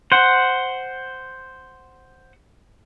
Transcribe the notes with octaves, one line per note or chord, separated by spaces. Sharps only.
C5 F#5